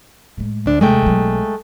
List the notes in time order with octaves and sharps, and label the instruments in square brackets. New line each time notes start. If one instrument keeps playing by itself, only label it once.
[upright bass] A2 G#3
[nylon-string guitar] D2 D4
[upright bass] D#2 C3 [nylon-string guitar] G#3 A3 G5
[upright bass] B1 F#3